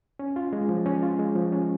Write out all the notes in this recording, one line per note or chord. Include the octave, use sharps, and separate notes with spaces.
C#4
F4
G#3
F3
C#4
F4
G#3
F3
C#4